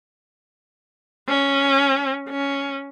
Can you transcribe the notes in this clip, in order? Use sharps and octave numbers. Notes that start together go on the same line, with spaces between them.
C#4
C#4